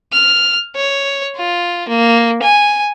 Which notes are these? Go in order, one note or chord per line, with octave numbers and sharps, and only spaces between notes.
F6
C#5
F4
A#3
G#5